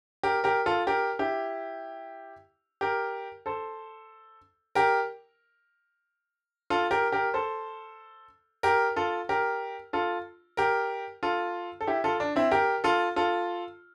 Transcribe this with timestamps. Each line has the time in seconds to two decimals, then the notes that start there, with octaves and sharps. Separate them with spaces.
0.23 G4 A#4
0.44 G4 A#4
0.66 F4 A4
0.87 G4 A#4
1.19 E4 G4
2.81 G4 A#4
3.46 A4 C5
4.75 G4 A#4
6.70 F4 A4
6.91 G4 A#4
7.12 G4 A#4
7.34 A4 C5
8.63 G4 A#4
8.96 F4 A4
9.29 G4 A#4
9.93 F4 A4
10.57 G4 A#4
11.23 F4 A4
11.81 A4
11.87 E4 G4
12.04 F4 A4
12.20 D4
12.36 C4 E4
12.51 G4 A#4
12.84 F4 A4
13.16 F4 A4